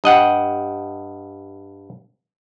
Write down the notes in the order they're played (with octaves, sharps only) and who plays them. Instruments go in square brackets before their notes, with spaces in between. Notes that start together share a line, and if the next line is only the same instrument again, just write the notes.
[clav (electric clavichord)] G2 D#5 F#5 G5